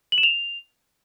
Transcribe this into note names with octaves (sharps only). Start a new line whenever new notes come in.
F#7
E7
F7